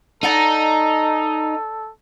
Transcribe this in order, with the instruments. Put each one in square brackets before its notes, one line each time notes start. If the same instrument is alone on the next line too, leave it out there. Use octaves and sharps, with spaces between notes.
[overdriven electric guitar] D#4 [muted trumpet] A4 [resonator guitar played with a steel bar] D5 F#5 A#5